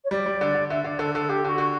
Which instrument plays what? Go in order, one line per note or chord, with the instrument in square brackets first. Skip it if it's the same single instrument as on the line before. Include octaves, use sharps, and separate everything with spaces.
[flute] C#5
[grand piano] G3 [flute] D5
[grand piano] G3
D3
D3
[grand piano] D3 [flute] E5
[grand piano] D3 [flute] D5
[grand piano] D3 [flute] A4
[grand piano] D3 [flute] A4
[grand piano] D3 [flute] G4
[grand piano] D3 [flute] F#4
[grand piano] D3